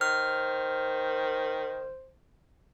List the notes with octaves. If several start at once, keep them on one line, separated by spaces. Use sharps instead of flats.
D#3 C5 F6